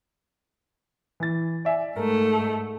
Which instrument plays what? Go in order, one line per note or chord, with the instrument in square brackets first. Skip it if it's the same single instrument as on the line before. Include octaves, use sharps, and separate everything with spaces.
[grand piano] E3 A6
D5 E5 G#5
[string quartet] G#2 A3 [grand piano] A#4